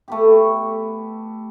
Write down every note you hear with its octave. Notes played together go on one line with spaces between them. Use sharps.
A3 B3 G4